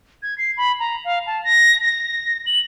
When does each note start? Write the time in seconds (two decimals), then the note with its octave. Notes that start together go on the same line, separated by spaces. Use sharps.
0.23 G#6
0.38 C7
0.57 B5
0.80 A#5
1.05 F5
1.27 A5
1.44 A#6
1.84 A#6
2.46 F#7